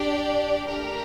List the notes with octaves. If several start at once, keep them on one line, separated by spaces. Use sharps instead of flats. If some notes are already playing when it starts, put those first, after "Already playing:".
Already playing: D4 G4 D5
A3 D4 G4 A#4